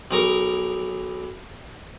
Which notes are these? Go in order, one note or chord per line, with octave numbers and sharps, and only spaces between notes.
B1 G#4 A#4 C#6